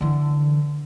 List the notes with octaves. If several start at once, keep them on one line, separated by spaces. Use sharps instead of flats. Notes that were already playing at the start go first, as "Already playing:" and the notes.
D3 E3